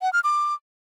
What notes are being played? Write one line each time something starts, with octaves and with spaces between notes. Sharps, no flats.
F#5
F6
D6